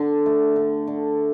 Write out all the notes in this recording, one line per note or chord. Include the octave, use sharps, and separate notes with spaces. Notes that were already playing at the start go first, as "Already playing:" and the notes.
Already playing: D3 D4
A3
D3
D3